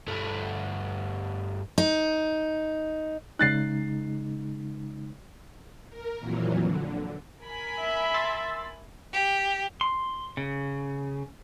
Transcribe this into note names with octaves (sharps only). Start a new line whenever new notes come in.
G2 A3
D#4
C#3 G#3 D#4 F#6 A6 C7
A#4
F2 A#2 E3 F#3
D3
A#4 G#5 B5
E5
C6 E6 A6
G4
C6
C#3